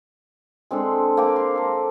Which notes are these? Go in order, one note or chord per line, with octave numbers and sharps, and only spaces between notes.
G#3 C4 D4 A4
A#3 C4 G5 D6
C6
A4 A#5